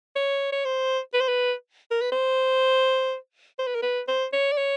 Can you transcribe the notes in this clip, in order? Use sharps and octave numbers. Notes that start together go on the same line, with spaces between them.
C#5
C#5
C5
B4
C5
B4
A#4
B4
C5
C5
B4
A#4
B4
C5
C#5
D5
C#5